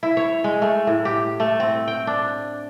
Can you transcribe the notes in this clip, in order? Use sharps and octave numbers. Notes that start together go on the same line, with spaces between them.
E4
C#5
G#3
A3
A2
G4
A3
C4
G5
D4